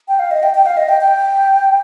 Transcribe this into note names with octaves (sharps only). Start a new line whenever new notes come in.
G5
F5
D#5
G5
G5
F5
D#5
G5
G5